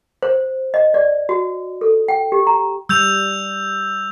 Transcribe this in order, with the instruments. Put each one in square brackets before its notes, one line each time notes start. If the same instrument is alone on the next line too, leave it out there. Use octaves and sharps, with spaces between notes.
[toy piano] C5
D#5
D5
F#4
A4
G5
G4
A#5
[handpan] G3 [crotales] E6 G6 F7